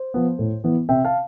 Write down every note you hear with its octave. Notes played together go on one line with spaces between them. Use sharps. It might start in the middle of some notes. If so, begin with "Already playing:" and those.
Already playing: C5
F3 B3
A2
E3 B3
C3 E5 G5
F5 A5